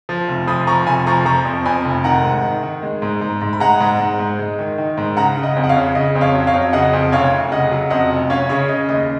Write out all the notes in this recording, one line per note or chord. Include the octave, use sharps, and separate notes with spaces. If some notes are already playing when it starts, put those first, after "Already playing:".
F3
F1
F3 B5 D#6
F3 A#5 C#6
F1 G#5 B5
F3 A#5 C#6
F3 A#5 C#6
F2
F2 G#5 B5
F1
D#3 F#5 A#5
G#2
D#3
D#3
G#3
G#2
G#2
G#2
B5
G#3 F#5 A#5
G#2
G#2
G#2
G#3
D#3
D#3
G#2
C#3 F#5 A#5
C#3
D#5 F#5
F2
F#5
C#5 F5
C#3
C#3 D#5
F2
C#5 F5
F#3
C#5 F5
F2
C#3 D#5 F#5
F2
F1 C#5 F5
F1
C#3 D#5 F#5
F#3
F2 D#5 F#5
F1
C#4 C#5 F5
C#3 C#5
C#3 D#5
D#2 D#5